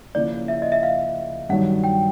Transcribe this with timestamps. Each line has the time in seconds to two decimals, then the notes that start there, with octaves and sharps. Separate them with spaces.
0.15 C#3 F3 A#3 C#4 E4 D5
0.48 E5
0.62 D#5
0.72 E5
0.83 F5
1.49 G2 D#3 F#3 F#5
1.84 G5